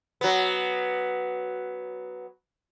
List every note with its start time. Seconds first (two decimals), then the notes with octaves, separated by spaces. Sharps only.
0.21 F#3 B3